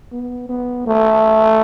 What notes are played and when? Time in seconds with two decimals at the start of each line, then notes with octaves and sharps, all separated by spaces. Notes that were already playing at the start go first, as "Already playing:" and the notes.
0.12 B3
0.49 B3
0.87 A3